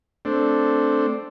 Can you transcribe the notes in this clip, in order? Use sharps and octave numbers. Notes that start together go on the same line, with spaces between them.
A3 C4 D4